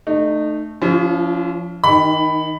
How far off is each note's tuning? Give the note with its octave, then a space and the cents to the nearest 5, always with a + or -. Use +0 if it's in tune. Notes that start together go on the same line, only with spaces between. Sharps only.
A3 +0 D#4 -35
F3 +0 C#4 +35 E4 +45
D#3 +25 D#4 -20 B5 +10